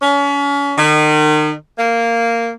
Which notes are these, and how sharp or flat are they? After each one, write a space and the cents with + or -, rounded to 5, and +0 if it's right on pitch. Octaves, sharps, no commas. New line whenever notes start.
C#4 +35
D#3 -35
A#3 -10